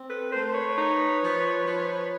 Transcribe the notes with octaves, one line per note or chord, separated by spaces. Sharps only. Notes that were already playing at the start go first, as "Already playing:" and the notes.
Already playing: C4
A4 B4
A3 A#4 C5
C5
B4 C#5
D#4
F3
F3